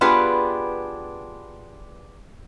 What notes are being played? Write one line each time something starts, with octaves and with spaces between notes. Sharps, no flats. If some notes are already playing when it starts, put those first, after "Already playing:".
B3 D4 F4 G4 G#4 B4